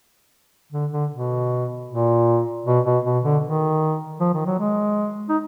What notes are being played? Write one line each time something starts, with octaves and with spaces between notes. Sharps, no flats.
D3
D3
B2
A#2
B2
B2
B2
D3
D#3
F3
D#3
F#3
G#3
D#4